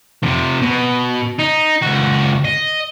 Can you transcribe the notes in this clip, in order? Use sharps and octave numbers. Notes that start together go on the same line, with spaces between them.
C3 F3
B2
D#4
C#2 F#4
D#5